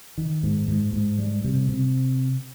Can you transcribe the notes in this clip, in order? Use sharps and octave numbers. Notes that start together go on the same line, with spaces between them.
D#3
G#2
G#2
G#2
G3
C3
C3